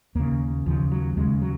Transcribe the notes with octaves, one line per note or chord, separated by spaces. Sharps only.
D#2 C#3 A#3
D#2 C#3 F3
F#3
D#2 C#3 G#3
F#3